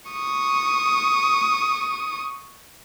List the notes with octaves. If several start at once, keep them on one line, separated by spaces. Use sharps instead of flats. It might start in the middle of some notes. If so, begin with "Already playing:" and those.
C#6 D#6